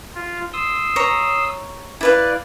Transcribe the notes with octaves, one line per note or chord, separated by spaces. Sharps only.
F4
C6 D#6 E6
C#5 A#5
E4 B4 D5 F5